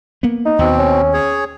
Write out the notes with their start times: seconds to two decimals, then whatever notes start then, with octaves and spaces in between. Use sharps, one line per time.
0.23 A#3 B3
0.45 D#4
0.59 D#2 B2 B3 C4
0.79 C#4
1.13 G#4 C#5